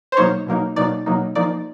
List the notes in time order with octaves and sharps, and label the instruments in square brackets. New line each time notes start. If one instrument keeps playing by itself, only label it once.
[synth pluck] C5
B2 F#3 A#3 D#4 C#5
B2 F#3 A#3 D#4
B2 F#3 A#3 D#4 D5
B2 F#3 A#3 D#4
F3 A#3 D#4 D5